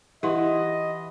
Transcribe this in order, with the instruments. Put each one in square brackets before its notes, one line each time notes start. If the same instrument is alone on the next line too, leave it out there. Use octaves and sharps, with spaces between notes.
[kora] E3 E4 [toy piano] G4 F#5 C6 [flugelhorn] D#5